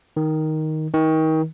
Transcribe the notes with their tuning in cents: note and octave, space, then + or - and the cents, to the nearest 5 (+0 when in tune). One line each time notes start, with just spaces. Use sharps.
D#3 +5
D#3 +30